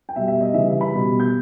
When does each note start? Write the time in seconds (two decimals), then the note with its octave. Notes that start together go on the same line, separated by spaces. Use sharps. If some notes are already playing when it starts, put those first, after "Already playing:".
0.09 G5
0.16 B2 G3 E5
0.28 E5
0.41 D#5
0.53 C#3 E3 G3 E5
0.71 E5
0.81 B5
0.91 B2 G3
1.20 G6